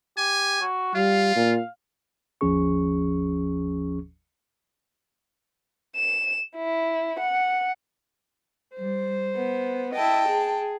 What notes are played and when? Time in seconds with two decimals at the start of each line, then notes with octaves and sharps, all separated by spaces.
0.18 G4 G#5
0.60 F#4
0.95 G3 F4 F5
1.36 A#2
2.41 G1 D#2 F3 C#4 G#4 C#6
5.96 E7
6.56 E4
7.19 F#5
8.77 G3 C5
9.35 B3
9.94 E4 D#5 G5 A5
10.28 G#4